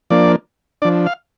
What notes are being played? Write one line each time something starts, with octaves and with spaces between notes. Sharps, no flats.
F3 A#3 D4 D5
F3 D4 D5
F5